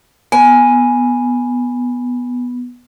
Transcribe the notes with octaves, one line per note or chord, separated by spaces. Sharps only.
B3 G#5